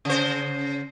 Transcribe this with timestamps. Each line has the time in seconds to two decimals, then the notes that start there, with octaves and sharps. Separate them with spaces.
0.05 C#3 C5